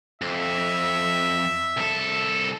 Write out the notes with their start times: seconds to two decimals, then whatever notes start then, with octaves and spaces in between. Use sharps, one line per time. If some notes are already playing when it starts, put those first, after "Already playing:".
0.22 F2 E5
1.77 C2 A4